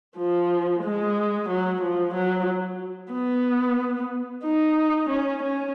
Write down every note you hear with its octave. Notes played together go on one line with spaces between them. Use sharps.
F3
G#3
F#3
F3
F#3
B3
D#4
C#4
C#4